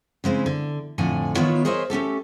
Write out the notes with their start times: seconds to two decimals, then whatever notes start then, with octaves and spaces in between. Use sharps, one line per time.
0.24 C#3 G#3 C4 E4
0.46 D3
0.98 F2 A2 D3 G#5
1.35 D#3 B3 E4 F4 C#5 E5
1.65 G#4 A#4 C5 C#5 D#5 E5
1.90 A3 C#4 G4 A4